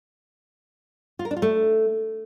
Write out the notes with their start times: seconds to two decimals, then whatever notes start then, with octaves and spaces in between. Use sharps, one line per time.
1.19 F4
1.25 A#4
1.31 D4
1.36 F4
1.42 A3